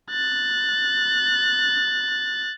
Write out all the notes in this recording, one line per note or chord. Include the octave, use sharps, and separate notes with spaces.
F#6 A6